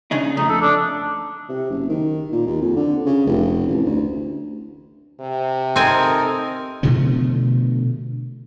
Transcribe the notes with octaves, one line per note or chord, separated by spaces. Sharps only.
C#3 D4 D#4
F2 A3 D#4
A4
D4
C3
F#1
D#3
A#2
D#2
F2
D3
C#3
F1
A1
D2
C3
C4 D#4 A4 A#4 G#5
B2 D3 F3 A3